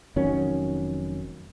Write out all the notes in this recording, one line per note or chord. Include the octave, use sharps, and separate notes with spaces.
F1 D#3 F#3 C#4